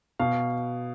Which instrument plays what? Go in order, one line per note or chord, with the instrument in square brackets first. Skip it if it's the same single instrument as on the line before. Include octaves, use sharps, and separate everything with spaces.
[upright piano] B2 F5